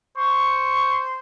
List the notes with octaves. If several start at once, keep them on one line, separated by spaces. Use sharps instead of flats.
C5 C#6